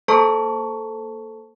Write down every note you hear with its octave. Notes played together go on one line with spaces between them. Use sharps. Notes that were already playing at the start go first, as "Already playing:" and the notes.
A#3 A4 C5 A5 A#5 C#6